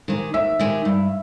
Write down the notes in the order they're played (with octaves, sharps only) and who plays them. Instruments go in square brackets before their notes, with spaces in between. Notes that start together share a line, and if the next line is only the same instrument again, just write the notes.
[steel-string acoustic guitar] D#3 G#3 D#4 G4
[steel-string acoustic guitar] D#2 [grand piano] E5
[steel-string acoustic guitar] D#3 G#3 D#4 G4
G2